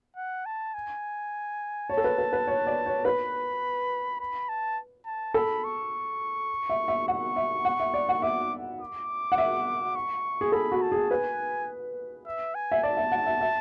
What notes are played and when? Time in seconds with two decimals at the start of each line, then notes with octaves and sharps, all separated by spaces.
0.16 F#5
0.46 A5
0.74 G#5
1.89 C#5 A5
1.97 A4
2.04 B4
2.18 B4
2.33 B4
2.47 C#5
2.67 D5
2.86 C#5
3.05 B4 B5
4.20 B5
4.49 A5
5.06 A5
5.34 A4 B5
5.64 C#6
6.69 E5
6.88 E5
7.08 F#5 C#6
7.36 E5
7.65 F#5
7.80 E5
7.94 D5
8.09 F#5
8.22 E5 D6
8.81 D6
9.32 F#5
9.38 E5
9.95 C#6
10.41 G#4
10.52 A4 B5
10.72 F#4
10.82 A5
10.92 G#4
11.10 B4 G#5
12.26 E5
12.55 G#5
12.72 E5
12.83 D5 A5
12.97 E5
13.12 F#5
13.26 E5
13.41 E5